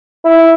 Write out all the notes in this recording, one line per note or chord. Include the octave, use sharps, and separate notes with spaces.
E4